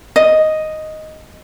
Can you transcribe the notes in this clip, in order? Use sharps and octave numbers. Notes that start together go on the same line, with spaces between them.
D#5